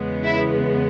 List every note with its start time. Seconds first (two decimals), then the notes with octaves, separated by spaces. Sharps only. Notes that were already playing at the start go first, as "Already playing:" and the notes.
Already playing: E2 C#3 G#3 B3
0.24 E4